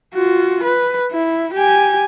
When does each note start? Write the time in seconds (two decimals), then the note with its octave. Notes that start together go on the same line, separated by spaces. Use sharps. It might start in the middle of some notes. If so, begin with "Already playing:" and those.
0.14 F4 F#4
0.64 B4
1.12 E4
1.54 G4 G#5